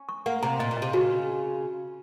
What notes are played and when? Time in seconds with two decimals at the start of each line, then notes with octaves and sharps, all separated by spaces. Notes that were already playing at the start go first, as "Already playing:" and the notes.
Already playing: C#4
0.09 C#6
0.26 A#3 F#5
0.43 C3 A#5
0.59 A#2 D#5
0.71 A#2
0.77 D#5
0.82 C3
0.93 C#3 F#4